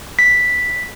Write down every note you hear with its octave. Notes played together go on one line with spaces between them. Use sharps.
B6